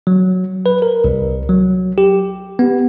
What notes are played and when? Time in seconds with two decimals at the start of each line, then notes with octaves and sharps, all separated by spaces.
0.07 F#3
0.66 B4
0.82 A#4
1.04 C2
1.49 F#3
1.98 G4
2.59 B3